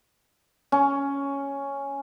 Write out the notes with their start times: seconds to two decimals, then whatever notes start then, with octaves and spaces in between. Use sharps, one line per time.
0.72 C#4